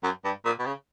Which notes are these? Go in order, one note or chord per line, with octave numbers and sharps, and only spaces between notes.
F#2
G2
A#2
B2
C#3